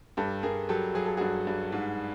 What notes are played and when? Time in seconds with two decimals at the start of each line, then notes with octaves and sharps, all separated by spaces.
0.17 G2 G4 A4
0.43 G2 G#4 A#4
0.69 F#3 G4 A4
0.95 F#3 G#4
1.06 A4
1.17 G2 F#4 G#4
1.47 G2
1.72 G#2